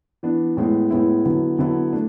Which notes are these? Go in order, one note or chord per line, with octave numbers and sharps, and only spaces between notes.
E3 B3 D4
A2 G#3 B3 E4
A2 G#3 B3 E4
D3 F#3 B3 E4
D3 F#3 B3 E4
A3 D4